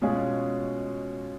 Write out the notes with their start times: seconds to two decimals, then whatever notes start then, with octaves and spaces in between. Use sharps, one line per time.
0.02 B2 G#3 C#4 F4 G#4